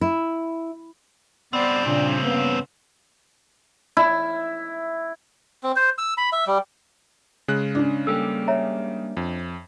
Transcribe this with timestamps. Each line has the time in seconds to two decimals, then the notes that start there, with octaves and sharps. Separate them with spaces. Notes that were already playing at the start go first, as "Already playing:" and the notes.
0.01 E4
1.53 G2 B3 C4 C5 D5
1.86 A#2 C#3 D4
2.23 A#3 B3 C#4
3.97 E4
5.64 C4
5.76 C5
5.98 E6
6.18 B5
6.33 E5
6.47 G3
7.48 C#3 G#3 F#6
7.75 C#4 D4
8.07 G3 A#3 G4 A4 E6
8.48 C#5 E5 A#5
9.17 F2